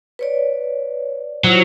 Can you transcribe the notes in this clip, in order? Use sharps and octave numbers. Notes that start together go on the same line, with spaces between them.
B4 C#5 D5
F#3 E4 F4 C5